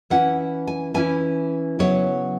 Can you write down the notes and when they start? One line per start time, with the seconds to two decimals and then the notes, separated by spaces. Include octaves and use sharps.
0.10 E3 C#4 E4 F#5
0.67 G#5
0.94 E3 C#4 E4 G#5
1.79 C#3 F#3 B3 E4 C#5